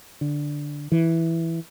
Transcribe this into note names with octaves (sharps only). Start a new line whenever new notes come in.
D3
E3